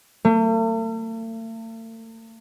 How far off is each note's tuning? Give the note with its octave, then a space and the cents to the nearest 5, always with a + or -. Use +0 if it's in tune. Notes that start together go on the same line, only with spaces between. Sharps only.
A3 +45